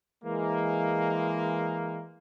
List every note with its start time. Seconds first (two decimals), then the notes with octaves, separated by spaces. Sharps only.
0.24 E3 G#3 A#3